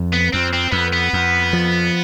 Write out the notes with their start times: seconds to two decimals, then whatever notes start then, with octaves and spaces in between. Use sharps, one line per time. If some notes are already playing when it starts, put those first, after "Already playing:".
Already playing: F2
0.13 B3
0.33 F2 C4
0.54 C4
0.72 F2 B3
0.93 B3
1.13 F2
1.53 F3